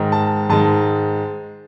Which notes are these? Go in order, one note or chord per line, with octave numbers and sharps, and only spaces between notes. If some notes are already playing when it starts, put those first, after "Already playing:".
Already playing: G#2 D#3 G#3
A5
G#2 D#3 G#3 A5